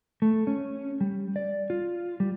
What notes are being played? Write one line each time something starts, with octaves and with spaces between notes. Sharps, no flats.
A3
C#4
G3
D5
F4
G3